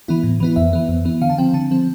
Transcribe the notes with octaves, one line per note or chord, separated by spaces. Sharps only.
E3 B3 E4
A2
E3 B3 E4
F2 E5
E3 B3
F2
E3 B3
D3 F5
A5
F3 C4 G5
D3 A5
F3 C4